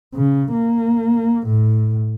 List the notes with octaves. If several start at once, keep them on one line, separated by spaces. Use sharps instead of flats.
C#3
A#3
A2